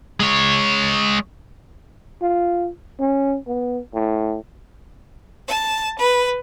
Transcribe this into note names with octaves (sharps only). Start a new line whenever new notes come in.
G#3 C#5
F4
C#4
B3
A2
A5
B4